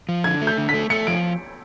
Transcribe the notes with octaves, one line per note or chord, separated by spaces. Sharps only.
F3
D3 G#6
A3
G6
D3
B6
A3
A3 C#7
F3 D7